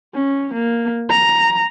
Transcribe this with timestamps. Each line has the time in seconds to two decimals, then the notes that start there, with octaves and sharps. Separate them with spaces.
0.14 C#4
0.54 A#3
1.10 A#5